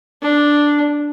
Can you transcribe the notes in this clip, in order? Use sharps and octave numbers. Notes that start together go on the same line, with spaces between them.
D4